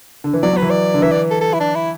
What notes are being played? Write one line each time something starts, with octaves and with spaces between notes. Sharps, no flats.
D3
E3
F#3 D5
F#3 B4
E3
D5
D3
E3 E5
D5
A4
A4
E4
D4
E4